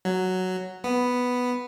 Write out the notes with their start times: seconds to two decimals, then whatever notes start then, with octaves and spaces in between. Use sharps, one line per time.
0.05 F#3
0.84 B3